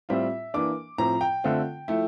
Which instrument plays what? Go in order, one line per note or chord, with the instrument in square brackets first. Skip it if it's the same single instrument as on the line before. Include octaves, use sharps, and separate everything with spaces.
[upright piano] A2 G3 C4 F4 E5
E3 A#3 D4 D6
A2 F3 C4 A#5
G5
D3 A3 C4 F4
F3 A3 E4